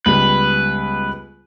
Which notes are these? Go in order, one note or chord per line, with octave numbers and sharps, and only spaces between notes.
C#2 G3 B3 B4